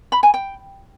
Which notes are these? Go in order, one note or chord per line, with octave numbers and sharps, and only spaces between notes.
B5
G#5
G5